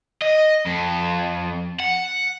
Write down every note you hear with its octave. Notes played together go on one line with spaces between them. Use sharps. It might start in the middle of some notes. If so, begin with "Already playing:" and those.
D#5
F2
F#5